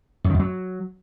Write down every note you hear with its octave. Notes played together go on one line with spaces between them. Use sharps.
F#2
D#3
F#2
F#3